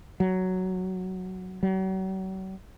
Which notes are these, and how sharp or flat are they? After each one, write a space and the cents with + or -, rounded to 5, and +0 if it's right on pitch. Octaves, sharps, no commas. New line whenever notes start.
F#3 +5
F#3 +40